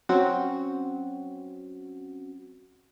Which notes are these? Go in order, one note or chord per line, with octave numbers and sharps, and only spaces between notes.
F#3 C4 C#4 F#4